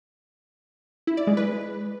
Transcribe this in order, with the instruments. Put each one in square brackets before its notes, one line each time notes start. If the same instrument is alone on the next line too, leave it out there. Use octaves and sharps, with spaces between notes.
[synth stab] E4
D5
G#3
B4